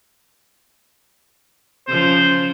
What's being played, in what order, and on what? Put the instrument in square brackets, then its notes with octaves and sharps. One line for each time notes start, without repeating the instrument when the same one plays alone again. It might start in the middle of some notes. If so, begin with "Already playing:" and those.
[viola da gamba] C#3 F3 [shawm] C5